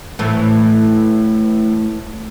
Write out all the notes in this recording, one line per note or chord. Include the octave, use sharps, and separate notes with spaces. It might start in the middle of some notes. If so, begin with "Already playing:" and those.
A2 E3 A3